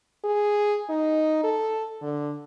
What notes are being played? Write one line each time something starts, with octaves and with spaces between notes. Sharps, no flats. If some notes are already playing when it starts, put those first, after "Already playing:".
G#4
D#4
A4
D3